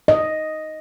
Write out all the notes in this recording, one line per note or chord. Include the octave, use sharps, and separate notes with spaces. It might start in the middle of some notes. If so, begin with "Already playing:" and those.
D#5